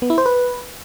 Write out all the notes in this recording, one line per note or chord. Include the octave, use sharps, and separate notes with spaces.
B3
E4
C5
B4